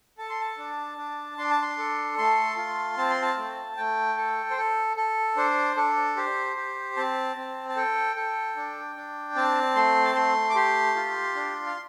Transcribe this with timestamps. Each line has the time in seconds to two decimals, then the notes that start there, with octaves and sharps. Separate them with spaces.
0.18 A4 A5
0.30 C6
0.41 A5
0.58 D4
0.98 D4
1.38 D4 C6
1.50 A5
1.62 C6
1.78 A4
2.18 A3 C6
2.57 F4
2.97 C4 A5
3.10 C6
3.22 A5
3.37 A3
3.77 A3 G5
4.17 A4
4.51 C5
4.57 A4
4.97 A4
5.37 D4 C5
5.76 D4 A4
6.17 G4 C5
6.56 G4
6.97 C4 A5
7.37 C4
7.69 A5
7.76 A4 G5
8.16 A4
8.56 D4
8.96 D4
9.35 C4 A5
9.76 A3 C6
10.05 A5
10.15 A3 C6
10.50 D6
10.55 G4 C6
10.96 F4
11.35 D4
11.67 F5